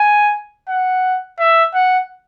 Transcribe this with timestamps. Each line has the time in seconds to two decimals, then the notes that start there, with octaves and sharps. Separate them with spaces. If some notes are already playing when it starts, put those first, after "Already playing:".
Already playing: G#5
0.69 F#5
1.39 E5
1.74 F#5